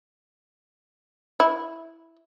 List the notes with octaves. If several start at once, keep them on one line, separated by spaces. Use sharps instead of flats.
E4